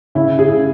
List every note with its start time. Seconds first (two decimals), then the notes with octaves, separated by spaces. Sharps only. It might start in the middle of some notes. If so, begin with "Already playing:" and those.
0.15 C#3 E4
0.39 C#3 G#4